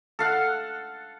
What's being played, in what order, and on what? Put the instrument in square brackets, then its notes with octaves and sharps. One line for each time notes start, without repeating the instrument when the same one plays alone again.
[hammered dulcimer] A4 F5 F#5